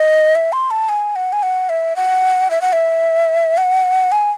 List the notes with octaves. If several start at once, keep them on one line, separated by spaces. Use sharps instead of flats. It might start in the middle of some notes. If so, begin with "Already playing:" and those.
Already playing: D#5
E5
C6
A5
G#5
F#5
G#5
F#5
E5
F#5
E5
F#5
E5
F#5
G#5